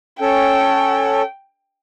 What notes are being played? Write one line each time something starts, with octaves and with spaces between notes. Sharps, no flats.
C#4 A4 G5